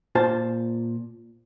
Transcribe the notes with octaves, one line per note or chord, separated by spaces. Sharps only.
A#2 F4 C5 A5